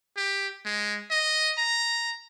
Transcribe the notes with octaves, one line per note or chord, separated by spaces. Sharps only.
G4
G#3
D#5
A#5